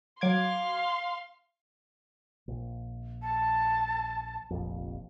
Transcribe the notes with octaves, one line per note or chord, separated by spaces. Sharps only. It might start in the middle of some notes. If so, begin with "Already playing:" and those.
F#3 F5 C6 D6 G#6
A#1
A5
F1 A#1 F2